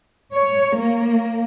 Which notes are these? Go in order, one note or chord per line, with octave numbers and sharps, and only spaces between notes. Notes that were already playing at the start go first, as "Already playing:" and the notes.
C#5
A#3